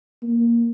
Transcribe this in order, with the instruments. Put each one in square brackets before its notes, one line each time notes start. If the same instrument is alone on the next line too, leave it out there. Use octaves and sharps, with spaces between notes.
[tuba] A#3